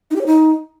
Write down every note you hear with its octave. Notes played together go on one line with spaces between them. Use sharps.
D#4
G4
C#5
D#4